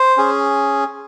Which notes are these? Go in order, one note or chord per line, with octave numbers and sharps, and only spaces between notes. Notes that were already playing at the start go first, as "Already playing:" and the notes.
Already playing: C5
C#4 G#4